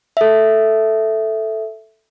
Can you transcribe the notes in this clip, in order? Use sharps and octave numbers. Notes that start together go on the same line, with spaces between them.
A4 E5